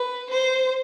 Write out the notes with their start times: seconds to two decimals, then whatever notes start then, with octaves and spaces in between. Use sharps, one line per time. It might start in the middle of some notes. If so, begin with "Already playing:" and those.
Already playing: B4
0.30 C5